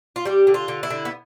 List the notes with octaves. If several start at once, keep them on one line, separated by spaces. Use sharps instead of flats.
F4
G3 G4
D3
F4
D3
E4
D3
B3